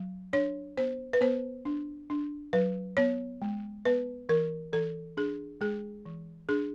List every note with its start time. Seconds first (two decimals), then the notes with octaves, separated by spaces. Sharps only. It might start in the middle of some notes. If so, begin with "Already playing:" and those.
Already playing: F#3
0.33 D4 C#5
0.77 B3 C5
1.13 B4
1.21 B3 C5
1.65 D4
2.10 D4
2.53 F#3 B4
2.97 B3 C#5
3.42 G#3
3.85 B3 B4
4.29 E3 A#4
4.73 E3 A4
5.17 D4 G#4
5.61 G#3 G#4
6.05 E3
6.49 D4 G#4